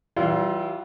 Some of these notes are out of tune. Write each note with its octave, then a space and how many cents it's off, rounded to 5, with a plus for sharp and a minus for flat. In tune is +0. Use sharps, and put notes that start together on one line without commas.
E3 -10 G3 -40 F4 +0